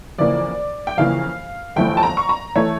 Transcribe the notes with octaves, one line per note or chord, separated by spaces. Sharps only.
F2 C#3 E3 A#3 D5
G5
F2 C#3 E3 A#3 F5
G1 F2 E3 A3 G5
A5
A#5
C#6
A#5
E3 A3 C#5